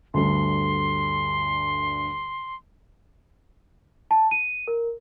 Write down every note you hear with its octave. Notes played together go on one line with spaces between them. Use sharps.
D2 G2 D3 C6
A5
D#7
A#4